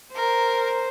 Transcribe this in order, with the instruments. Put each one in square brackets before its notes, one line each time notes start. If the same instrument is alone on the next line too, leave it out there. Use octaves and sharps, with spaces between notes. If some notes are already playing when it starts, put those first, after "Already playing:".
[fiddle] A#4 [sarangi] C5